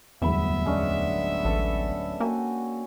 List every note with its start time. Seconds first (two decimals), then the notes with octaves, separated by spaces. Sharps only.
0.22 D1 G1 E2 B3 E5 B5
0.66 G#3 C#4 D4
1.45 A1 A4 B4
2.20 A#3 F#4 G5 G#5